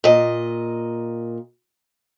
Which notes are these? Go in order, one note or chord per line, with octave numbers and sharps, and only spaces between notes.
A#2 D#5